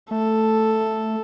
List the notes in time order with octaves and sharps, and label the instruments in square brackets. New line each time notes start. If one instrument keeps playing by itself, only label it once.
[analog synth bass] A3 [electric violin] A4